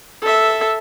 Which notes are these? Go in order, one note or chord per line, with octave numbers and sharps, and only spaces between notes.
A4 E5